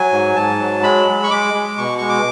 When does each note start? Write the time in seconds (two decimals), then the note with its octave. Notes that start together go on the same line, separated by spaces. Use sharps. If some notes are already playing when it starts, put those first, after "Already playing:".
Already playing: F#3 G#5
0.12 G#2
0.36 G#2 A5
0.59 F#3
0.83 G#3 B5
1.07 G#3
1.24 C#6
1.30 G#3 D6
1.54 G#3
1.78 B2 C#6
1.98 G#3 C#6
2.09 D6